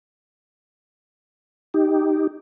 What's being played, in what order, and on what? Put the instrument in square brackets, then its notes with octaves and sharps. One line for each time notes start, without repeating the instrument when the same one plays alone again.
[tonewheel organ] D#4 G4